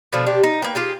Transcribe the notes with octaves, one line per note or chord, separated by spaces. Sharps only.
B2 D3 F3 A3
C3 D4 G4
D#4
A#3 B4 G5
F4 G4 G#4